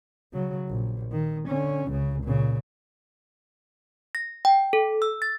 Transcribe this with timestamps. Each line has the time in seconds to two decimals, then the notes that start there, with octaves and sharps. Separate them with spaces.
0.33 C#3 F#3
0.69 A#1
1.12 D#3
1.49 D3 C#4
1.89 C#2 C#3
2.23 A#2 C#3
4.15 A#6
4.45 G5
4.73 A4
5.02 E6
5.22 A6